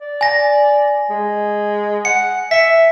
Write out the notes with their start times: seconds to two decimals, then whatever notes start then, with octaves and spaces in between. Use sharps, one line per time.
0.01 D5
0.21 G#5 A#6
1.10 G#3
2.05 F#5 C#7
2.51 E5 B6 C#7